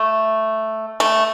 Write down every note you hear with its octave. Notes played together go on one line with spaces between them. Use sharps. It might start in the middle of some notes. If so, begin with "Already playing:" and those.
Already playing: A3
A3